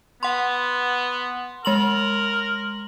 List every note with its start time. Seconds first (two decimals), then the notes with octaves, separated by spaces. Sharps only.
0.23 B3 F#5 C6
1.65 G#3 A#4 C6 F#7